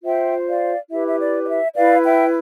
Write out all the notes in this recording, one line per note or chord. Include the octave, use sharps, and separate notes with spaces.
F4 C5 E5 G5
D5 F5
E4 G4 B4 E5
E5
D5
D5
E5
E4 B4 D5 F5
E5 G5